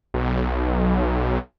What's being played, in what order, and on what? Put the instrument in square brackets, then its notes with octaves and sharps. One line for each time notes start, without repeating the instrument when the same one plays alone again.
[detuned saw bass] B1